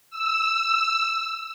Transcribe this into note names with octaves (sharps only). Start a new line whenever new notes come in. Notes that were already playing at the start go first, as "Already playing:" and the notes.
E6